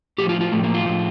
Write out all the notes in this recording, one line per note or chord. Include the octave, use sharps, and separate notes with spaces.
A2 F3 G4
F4
F4
A2 F3 A3
A#3
F4
A2 F3